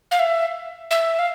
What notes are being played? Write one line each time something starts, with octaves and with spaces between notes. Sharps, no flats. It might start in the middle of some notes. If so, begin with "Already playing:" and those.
F5
E5
E5
F5